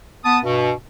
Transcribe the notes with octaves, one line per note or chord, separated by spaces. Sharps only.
B3 A5 D#6
G2 B2